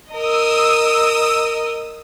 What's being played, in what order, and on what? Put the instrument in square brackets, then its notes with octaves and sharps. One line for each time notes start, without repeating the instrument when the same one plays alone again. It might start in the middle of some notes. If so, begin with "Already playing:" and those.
[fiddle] A#4 D#5 [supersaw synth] D#6 E6